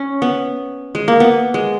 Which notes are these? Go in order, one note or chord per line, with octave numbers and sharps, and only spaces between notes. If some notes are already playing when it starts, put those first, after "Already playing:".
Already playing: C#4
B3
G#3
A#3
B3
G#3